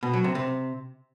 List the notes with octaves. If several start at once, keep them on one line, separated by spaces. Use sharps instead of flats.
B2
F#3
C3
C3